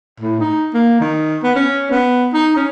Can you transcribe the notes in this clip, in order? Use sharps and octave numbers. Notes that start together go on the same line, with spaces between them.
A2
D#4
A#3
D#3
B3
C#4
B3
D#4
C#4